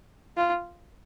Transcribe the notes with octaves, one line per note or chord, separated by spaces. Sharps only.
F4